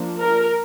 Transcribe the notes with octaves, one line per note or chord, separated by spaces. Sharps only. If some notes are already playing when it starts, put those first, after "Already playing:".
Already playing: F3 A#3 D4
A#4